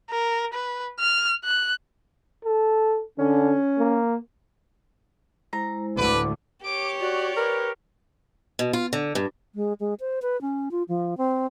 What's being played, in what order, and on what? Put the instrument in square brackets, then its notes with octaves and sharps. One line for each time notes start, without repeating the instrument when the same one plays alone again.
[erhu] A#4
B4
F6
F#6
[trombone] A4
[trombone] D3 [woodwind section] C#4
[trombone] A#3
[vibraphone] G#3 E4 C5 [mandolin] A#5
[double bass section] D2 A2 D3 [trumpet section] B4 [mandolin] D6
[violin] G4 C#5 [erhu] D6
[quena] F#4 [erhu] D5
[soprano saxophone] A#4 [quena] B4
[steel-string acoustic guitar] B2
F4
D3
G2
[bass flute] G#3
G#3
C5
B4
C#4
F4
F3
C4